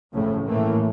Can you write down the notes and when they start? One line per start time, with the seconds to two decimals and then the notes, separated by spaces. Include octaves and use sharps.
0.13 A1 F2 A2 C#3
0.47 A2 E3 A3 A#3